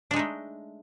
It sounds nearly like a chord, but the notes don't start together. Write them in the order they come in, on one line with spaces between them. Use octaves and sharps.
D4 G#3 D#4 A3